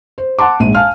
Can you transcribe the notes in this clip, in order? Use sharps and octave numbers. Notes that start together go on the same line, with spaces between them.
C5
F#5 A5 C6 D6
A#1 G#2 D#7
F5 G#5 A5 F6